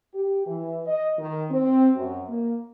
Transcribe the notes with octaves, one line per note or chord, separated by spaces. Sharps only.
G4
E3
D#5
D#3
C4
F#2
A#3